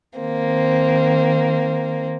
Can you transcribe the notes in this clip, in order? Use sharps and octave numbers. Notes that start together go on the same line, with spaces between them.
D#3 A#3 C4